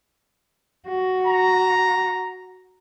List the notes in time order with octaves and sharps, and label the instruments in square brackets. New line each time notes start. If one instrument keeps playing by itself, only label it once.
[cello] F#4
[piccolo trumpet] A#5